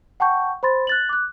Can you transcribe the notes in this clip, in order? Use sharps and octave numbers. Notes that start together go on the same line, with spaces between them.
F#5 G5 A5 C#6 G6
C5 B5 C6 A6
F#6 A6 F#7
D6 F#6